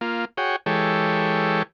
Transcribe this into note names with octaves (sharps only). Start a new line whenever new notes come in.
A#3 F4
F#4 G#4 C#5 G5
E3 G#3 G4 A4 C#5